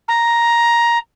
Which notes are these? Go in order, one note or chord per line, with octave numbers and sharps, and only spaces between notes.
A#5